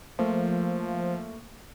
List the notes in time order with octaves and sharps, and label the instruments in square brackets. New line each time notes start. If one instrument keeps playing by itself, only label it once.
[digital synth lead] F3 [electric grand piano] A3 A#3